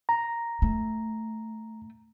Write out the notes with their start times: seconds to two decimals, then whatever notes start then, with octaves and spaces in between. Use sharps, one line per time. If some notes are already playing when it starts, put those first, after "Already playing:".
0.09 A#5
0.62 A3